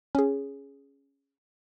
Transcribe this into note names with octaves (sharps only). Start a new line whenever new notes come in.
C#4 G#4